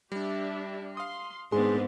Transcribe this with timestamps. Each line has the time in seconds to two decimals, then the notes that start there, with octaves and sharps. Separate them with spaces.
0.12 G3 D4 G4 E5
0.97 F5 C6 D#6
1.52 G#2 D#3 B3 C4 D4 G#4 C6